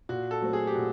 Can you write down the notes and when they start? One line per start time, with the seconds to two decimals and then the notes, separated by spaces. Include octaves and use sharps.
0.09 A#2 F#4
0.31 A4
0.42 F#3 A3 C4
0.53 G#4
0.67 G4
0.75 A#2 F#4